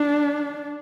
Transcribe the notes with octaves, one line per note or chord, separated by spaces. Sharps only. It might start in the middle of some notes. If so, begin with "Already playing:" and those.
Already playing: D4